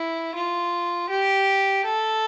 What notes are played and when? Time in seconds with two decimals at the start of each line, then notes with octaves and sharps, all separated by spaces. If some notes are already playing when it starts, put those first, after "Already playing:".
Already playing: E4
0.35 F4
1.10 G4
1.85 A4